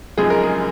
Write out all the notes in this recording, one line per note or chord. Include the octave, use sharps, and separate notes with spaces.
F#1 F#2 F3 G#3 D#4 G#4
A#4
G#4